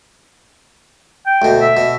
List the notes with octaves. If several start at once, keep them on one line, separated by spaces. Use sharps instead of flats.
G5
D2 B2
E5
B2